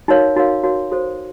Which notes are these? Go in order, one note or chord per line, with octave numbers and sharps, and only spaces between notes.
D#4 F#4 A#4 C#5 F5
D#4 F#4 A#4 C#5 F5
D#4 F#4 A#4 C#5 F5
F#4 A4 C5